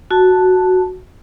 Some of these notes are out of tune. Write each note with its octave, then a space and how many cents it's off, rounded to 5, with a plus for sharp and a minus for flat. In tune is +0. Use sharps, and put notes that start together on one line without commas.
F#4 +0 A5 +0